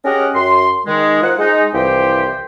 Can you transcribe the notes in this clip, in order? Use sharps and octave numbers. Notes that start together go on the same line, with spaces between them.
C#4 G4 G#4 A#4 D#5 F#5
F#2 C6
D#3 G#3
F4 A#4 C5 F#5
G#3 D#4
C2 E3 F3 G4 C5 G5